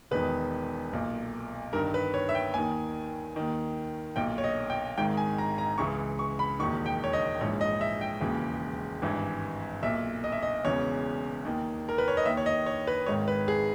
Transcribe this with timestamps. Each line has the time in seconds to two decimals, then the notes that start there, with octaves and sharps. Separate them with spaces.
0.11 E1 E2 D#3 B4
0.93 B1 A#2
1.73 G1 G2 D#3 A#4
1.94 B4
2.14 C#5
2.29 E5
2.35 G5
2.54 D#2 D#3 G#5
3.36 D#2 D#3
4.16 B1 A#2 G5
4.38 C#5
4.44 D#5
4.70 G5
4.97 G#1 G#2 D#3 G5
5.17 G#5
5.38 A#5
5.58 A#5
5.78 C#2 C#3 E3 C#6
6.19 C#6
6.39 B5
6.59 E1 D#2 D#3 C#6
6.86 G5
7.04 C#5
7.13 D#5
7.40 A#1 G#2 E3 C#5
7.61 D#5
7.81 E5
8.01 G5
8.21 E1 D#2 C#3 E3
9.02 G#1 G2 E3
9.83 B1 A#2 E5
10.24 D#5
10.32 E5
10.42 D#5
10.64 E1 E2 C#3 E3 C#5
11.45 D#2 D#3
11.89 A#4
11.98 B4
12.08 C#5
12.17 D#5
12.25 D#2 D#3 E5
12.37 C#5
12.46 D#5
12.66 C#5
12.87 B4
13.06 G#1 G#2 D#3 C#5
13.28 B4
13.48 G#4